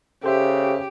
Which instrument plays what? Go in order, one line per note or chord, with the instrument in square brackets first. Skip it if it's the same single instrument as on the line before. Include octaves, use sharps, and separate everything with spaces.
[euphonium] C#3 [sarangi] G4 [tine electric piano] A4 C5 E5